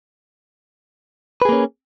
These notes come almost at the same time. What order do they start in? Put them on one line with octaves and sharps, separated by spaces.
B4 G#4 A#3 C#4